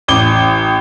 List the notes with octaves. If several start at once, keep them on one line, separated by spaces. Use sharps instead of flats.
A1 D6 G7